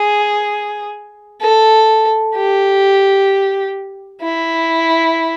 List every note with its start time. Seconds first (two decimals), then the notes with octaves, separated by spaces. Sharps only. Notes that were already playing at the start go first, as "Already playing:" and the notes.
Already playing: G#4
1.41 A4
2.35 G4
4.22 E4